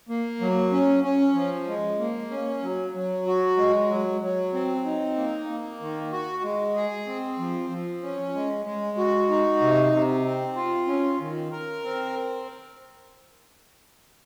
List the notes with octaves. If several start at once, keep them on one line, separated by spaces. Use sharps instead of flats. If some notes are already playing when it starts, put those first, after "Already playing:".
A#3
F#3
C#4
C#4
F3
G#3
A#3
C#4
F#3
F#3
F#4
G#3
F#3
F#3
C4
D#4
A#3
A#3
D#3
F#4
G#3
G#4
C4
F3
F3
C#4
G#3
G#3
F#4
D#4
C3
C3
C4
F4
C#4
D#3
A#4
C4